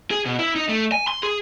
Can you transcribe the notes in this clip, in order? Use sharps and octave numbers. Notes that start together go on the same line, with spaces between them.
G#4
B2
E4
D#4
A3
G#5
C6
G#4